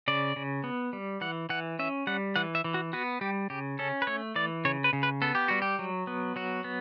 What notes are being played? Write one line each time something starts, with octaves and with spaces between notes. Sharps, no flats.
C#3 D5
C#3
B3
G3
E3 F#5
E3 F#5
C#4 E5
G3 F#5
E3 F#5
E5
E3
F#4
B3 F#4
G3 G4
C#3 G4
C#4 A4
B4
A3 C#5
E3 D5
C#3 C#5
B4
C#3
B4
B3 A4
G4
G3 F#4
G4
F#3
B3
F#3 F#4
B3